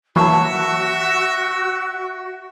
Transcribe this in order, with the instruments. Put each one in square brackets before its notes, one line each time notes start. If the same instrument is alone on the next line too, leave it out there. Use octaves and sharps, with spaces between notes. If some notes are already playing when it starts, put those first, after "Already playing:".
[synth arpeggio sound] E3 F#3 A#3 [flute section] F#4 [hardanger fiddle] E5 [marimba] A5 C#6